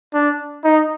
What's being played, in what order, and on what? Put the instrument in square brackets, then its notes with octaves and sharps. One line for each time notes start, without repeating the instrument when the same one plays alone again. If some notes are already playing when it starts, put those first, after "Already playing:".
[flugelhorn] D4
D#4